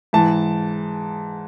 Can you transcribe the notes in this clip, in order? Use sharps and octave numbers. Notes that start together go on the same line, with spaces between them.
G#2 E3 A5